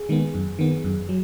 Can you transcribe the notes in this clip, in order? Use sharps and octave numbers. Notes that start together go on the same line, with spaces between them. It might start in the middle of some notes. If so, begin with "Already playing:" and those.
Already playing: G#4
D#3 G#3 B3
F#2
D#3 B3
F#2
F#3